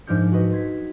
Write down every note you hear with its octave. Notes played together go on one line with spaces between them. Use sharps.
G#2 F3 D4 A#4 G6 C#7
F#4 A4 B4 D#5
C6 G#6 B6